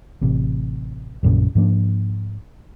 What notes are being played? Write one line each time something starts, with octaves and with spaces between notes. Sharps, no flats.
A1 C3
A#1 F#2 A#2 C#3
G#2 F3 A#3 D4